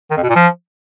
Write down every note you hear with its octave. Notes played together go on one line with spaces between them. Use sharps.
D#3
F2
B2
A#2
F3